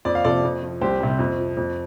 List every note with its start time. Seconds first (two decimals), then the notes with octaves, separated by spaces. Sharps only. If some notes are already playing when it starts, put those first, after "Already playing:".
0.05 F2 D5
0.15 F5
0.24 C3 F3 A4 D5
0.44 F2
0.63 F3
0.81 C2 G4 C5
1.01 C3 G3
1.19 F2
1.38 F3
1.57 F2